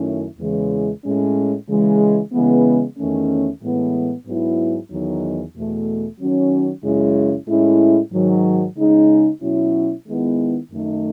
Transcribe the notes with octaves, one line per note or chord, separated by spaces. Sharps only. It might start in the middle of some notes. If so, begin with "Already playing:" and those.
Already playing: F#2 D#3 A3 C#4 E4
E2 C#3 E3 G#3
A2 G#3 C#4
C#3 E3 G#3
C#3 E3 G#3 B3
E2 D#3 A3 C#4
A2 E3 G#3 B3
G#2 F#3 B3 E4
E2 D#3 F#3 B3 D#4
E2 B2 A3
D#3 F#3 C#4
F#2 C#3 G#3 C#4 E4
A2 G#3 C#4 E4
G#2 D#3 F#3
C#3 G#3 D#4
B2 F#3 C#4 E4
D#3 G#3 B3 E4
F#2 D#3 A3 D#4